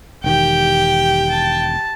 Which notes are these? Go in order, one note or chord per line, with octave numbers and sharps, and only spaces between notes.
E1 D#3 G4 G5
A5